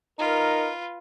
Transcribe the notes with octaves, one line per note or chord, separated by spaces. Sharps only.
D#4 F4 A#4 B4